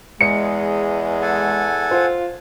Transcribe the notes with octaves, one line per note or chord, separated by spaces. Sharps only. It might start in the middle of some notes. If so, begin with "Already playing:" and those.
E2 G#3 C#7
A4 F#5 G#5
F4 C5